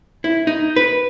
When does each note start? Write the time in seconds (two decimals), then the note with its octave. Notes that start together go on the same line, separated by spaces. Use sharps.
0.24 E4
0.47 D#4
0.76 B4